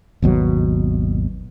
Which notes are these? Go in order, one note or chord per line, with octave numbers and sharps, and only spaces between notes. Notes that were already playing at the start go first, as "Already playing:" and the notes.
G#1 D#2 B2 F#3